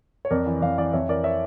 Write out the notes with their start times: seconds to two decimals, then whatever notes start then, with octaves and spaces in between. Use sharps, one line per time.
0.25 C#5
0.30 F2 A#4 D5
0.46 E3
0.61 F2 D5 F5
0.78 E3 D5 F5
0.93 F2 C#5 E5
1.08 E3 A#4 D5
1.24 C#5 E5